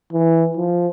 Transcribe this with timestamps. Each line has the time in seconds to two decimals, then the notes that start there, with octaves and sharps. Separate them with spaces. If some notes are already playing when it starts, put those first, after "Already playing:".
0.13 E3
0.57 F3